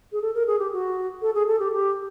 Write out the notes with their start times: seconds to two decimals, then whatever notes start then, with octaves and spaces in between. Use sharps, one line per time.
0.12 G#4
0.22 A4
0.34 A#4
0.47 G#4
0.59 G4
0.73 F#4
1.22 A4
1.34 G#4
1.48 A4
1.60 G4
1.73 G4